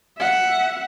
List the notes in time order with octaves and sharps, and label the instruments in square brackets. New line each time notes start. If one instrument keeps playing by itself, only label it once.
[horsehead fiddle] E5 F#5